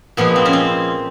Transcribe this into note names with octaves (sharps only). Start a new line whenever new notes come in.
A#2 F3 G#3 B3
C4
C#4
C4